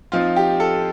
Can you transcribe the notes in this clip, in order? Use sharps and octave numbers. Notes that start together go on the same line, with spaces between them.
F3 C4 D#4 F4
G4
A4